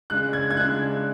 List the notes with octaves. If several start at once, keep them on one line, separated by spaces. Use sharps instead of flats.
C#3 G#3 D4 F#6
G#6
G#6
C#3 G#3 D4 F#6